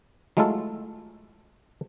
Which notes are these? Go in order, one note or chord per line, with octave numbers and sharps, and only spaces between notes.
F#3 G#3 A3 E4 F4 A4